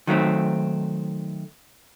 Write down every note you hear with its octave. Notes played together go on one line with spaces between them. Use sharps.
D#3 F#3 A3 C4